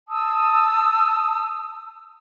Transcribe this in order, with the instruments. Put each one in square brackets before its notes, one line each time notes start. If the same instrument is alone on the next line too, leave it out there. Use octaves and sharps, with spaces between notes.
[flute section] A5 D#6 E6